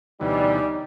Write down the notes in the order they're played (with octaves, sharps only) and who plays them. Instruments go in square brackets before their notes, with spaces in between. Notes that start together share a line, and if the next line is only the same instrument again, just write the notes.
[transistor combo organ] D2 B2 E3 [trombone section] G3 [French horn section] D#4 [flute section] C#5 D5 G#5